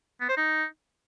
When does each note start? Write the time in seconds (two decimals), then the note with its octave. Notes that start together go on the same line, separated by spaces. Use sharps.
0.21 B3
0.29 C5
0.37 D#4